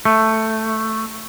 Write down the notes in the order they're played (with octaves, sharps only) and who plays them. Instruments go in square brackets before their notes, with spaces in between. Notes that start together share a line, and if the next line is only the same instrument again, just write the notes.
[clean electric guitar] A3